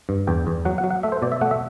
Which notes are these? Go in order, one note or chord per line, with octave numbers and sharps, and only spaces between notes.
G2
E2 G5
E2
F#3 F#5
F#5
F#3
F#5
A3 E5
C5
B2 D5
E5
A3 F#5
E5